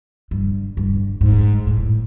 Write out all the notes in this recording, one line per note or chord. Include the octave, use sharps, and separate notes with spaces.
G2
G2
G#2
A2